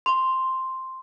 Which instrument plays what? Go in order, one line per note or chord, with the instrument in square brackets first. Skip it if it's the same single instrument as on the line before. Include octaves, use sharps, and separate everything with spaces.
[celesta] C6